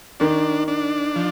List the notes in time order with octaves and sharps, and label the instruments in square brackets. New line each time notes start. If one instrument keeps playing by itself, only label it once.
[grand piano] D#3 [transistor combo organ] D4
[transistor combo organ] D4
F3